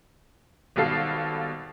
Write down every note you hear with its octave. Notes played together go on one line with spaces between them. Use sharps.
G#1 B2 G3 A4 F5 C7